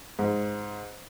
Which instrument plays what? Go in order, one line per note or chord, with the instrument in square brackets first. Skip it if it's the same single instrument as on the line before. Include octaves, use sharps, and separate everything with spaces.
[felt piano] G#2